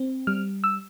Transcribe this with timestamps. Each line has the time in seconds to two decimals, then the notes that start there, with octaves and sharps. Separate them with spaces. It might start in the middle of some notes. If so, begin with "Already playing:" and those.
Already playing: C4
0.27 G3 F6
0.64 E6